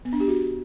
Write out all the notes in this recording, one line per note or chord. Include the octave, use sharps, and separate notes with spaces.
B3
D4
G4
F#4